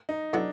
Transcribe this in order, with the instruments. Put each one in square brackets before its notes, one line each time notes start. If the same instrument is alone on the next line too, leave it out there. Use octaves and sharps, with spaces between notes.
[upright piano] D#4
[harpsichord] A2 F#3 B3 E4 [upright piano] D4